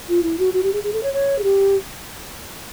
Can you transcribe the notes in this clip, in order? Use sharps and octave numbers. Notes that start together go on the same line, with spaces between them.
F4
E4
F#4
F#4
G4
G#4
G#4
A4
C#5
C#5
G#4
G4